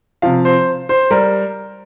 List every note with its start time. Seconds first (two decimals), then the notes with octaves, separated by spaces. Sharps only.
0.22 C3 F3 F5
0.45 C5
0.89 C5
1.11 G3 A#4